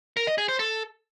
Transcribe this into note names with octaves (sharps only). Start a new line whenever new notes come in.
A#4
D#5
G#4
C5
A4